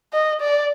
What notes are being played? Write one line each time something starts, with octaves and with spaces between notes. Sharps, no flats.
D#5
D5